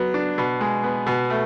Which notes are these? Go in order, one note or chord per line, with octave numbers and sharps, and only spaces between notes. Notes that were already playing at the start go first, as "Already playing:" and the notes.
Already playing: F#3 B3
D4
B2
G#3
B3
B2
A3